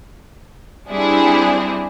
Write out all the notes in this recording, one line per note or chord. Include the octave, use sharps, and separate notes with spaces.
G3 C4 D4 E4 G#4